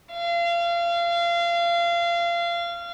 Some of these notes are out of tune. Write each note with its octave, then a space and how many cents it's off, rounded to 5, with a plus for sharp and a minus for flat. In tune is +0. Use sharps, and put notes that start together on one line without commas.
F5 -30